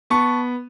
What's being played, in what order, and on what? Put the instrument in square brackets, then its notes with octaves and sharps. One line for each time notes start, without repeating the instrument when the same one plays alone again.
[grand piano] B3 A5 C#6